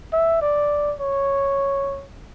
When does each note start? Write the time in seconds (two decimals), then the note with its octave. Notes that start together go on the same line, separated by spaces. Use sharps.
0.13 E5
0.42 D5
1.00 C#5